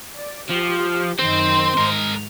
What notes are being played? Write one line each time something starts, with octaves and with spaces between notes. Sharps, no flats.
D5
F3 G4
F#2 D#3 C4 C5
G#2 G#3 A#4